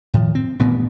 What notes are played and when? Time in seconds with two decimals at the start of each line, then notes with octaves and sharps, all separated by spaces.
0.14 A2 D#3 F3
0.35 C4
0.59 A1 G2 A#2 B3